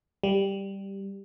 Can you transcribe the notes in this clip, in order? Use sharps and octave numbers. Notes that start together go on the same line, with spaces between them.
G3